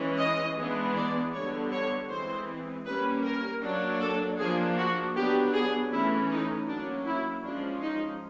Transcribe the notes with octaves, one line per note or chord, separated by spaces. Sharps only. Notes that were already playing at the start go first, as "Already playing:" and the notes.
Already playing: E3 G#3 C#4
D#5
E3 G#3 B3 D4
D5
D3 G3 B3 D4 C#5
C#5
E3 G#3 C4 C5
G3 A#3 C#4 B4
A#4
F#3 A#3 D4
A4
F3 A#3 D4 G#4
F#4
F#3 B3 D4 G4
G#4
E3 A3 C#4 E4
D#4
F#3 A#3 C#4 D4
E4
F3 G#3 C#4 D4
D#4